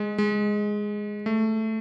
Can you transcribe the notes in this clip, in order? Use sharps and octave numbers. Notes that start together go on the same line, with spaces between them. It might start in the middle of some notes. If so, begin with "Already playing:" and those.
Already playing: G#3
G#3
A3